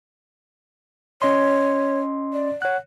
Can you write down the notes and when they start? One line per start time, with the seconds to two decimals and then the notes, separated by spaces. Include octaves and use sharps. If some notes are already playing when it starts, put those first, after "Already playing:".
1.22 C#4 C#5 D#5 C6
2.33 D5
2.62 C#5 F#5 F#6